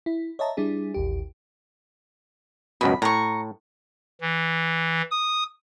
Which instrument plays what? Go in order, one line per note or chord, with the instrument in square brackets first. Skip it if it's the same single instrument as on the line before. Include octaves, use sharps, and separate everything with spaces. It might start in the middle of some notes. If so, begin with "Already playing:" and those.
[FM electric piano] E4
C#5 D#5 E5 A5 A#5
G3 D4 E4 G#4
A1 D#2 G4
[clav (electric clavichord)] C#2 F#2 B2 [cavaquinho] B5
[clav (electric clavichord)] A2 [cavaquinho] A#5 C#6
[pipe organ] E3
D#6